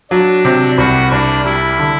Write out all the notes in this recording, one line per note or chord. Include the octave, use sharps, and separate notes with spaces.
F#3 D4
C3
C2 F#4
C2 D4
G3 E4
D3